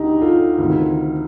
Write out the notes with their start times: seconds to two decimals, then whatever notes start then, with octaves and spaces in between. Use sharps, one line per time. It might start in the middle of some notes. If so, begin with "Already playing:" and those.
Already playing: D2 D3 D#4 G4
0.21 F4 A4
0.58 D2 C3 D#3